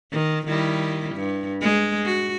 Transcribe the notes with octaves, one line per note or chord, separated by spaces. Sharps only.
D#3
D#3 G3 E4
G2
G#3
F#4